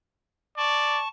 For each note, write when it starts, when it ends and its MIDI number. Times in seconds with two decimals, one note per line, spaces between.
0.57 1.00 74
0.57 1.08 81
0.57 1.08 85